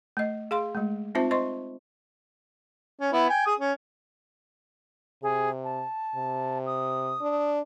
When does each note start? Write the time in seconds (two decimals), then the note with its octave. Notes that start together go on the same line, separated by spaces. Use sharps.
0.17 A3 D#5
0.51 G#4 F5 C6
0.75 G#3 A3
1.15 C4 D#4 F4 C5 E5 A5
1.31 C5 D#5 C6 C#6
3.00 C#4
3.13 B3 E4
3.30 G5 G#5
3.47 G#4 D#6
3.59 C#4
5.23 C3 G#4
5.64 A5
6.15 C3
6.66 D#6
7.21 D4